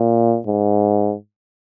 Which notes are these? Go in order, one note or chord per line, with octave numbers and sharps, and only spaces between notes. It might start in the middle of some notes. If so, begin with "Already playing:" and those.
Already playing: A#2
G#2